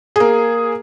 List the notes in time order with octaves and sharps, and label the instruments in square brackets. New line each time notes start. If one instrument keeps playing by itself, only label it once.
[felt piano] A#3 G#4